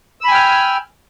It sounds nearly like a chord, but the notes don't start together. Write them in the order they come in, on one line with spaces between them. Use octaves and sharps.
E6 B5 G#5 G5 F6